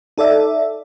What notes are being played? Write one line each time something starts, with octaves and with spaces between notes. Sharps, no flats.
D#4 A4 D5 E5